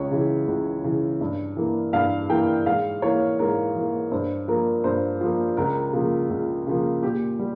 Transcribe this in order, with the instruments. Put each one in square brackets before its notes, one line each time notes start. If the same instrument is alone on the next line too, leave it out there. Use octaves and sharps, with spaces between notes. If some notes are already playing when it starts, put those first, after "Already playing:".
Already playing: [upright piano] C#2 C#5
C#3 E3
C#2
C#3 E3
G2
E3 A#3
G2 F5
E3 A#3 G5
G#2 F5
E3 A#3 C#5
G#2 A#4
E3 A#3
G2 C5
F3 A#3 A#4
G2 C5
F3 A#3
C#2 A#4
C#3 F3 A#3
C#2
C#3 F3 A#3
A#2 G4
G3